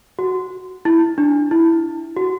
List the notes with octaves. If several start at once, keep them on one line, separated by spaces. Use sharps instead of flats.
F#4
E4
D4
E4
F#4